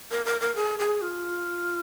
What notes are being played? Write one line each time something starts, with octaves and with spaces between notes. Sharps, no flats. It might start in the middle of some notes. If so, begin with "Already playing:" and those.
A#4
A#4
A#4
G#4
G#4
F4